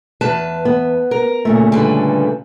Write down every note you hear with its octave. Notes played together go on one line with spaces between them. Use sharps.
E2 B4 A5
B3
A#4
A#2 C#3 A3
D3 G3 B4